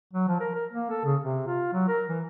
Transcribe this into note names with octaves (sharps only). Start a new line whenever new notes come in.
F#3
F3
A#4
A#4
A#3
A4
C#3
C3
F4
F#3
A#4
E3